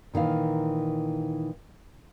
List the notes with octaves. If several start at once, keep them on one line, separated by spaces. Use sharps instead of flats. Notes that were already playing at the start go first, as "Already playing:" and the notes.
A#2 D#3 E3 F5